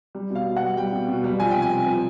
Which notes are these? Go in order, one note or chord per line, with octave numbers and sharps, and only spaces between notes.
G3
B2
F5
B2
G3 F#5
G3 G5
B2
B2
G3
F3 G#5
C3 G5
G#5
C3
F3